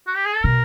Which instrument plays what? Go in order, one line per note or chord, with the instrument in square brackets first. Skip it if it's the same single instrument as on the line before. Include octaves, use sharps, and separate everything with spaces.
[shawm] F#4
G4
G#4
A4
[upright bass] B2 [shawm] A#4